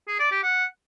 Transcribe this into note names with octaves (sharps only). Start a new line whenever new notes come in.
G#4
D5
G4
F#5